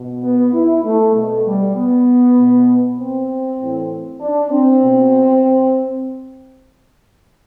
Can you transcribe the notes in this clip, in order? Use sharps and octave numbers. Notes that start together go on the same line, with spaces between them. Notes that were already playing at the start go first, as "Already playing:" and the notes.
Already playing: B2
B3
E4
A3
B2 A3
G3
B3
B2
C4
A2 E3
D4
C4
B2